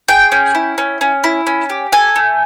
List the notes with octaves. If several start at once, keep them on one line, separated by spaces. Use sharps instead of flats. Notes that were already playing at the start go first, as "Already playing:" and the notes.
G#4 G5
C#4
E4
C#4
C#4
E4
C#4
G4
A4 G#5
A3